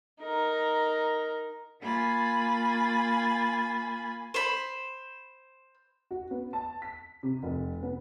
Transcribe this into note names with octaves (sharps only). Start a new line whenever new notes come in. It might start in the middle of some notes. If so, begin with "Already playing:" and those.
D#4 A#4
A#3 F4 G#5 B5 A6
C5 B5
F#4
B3
A5
B6
C3
F1
B3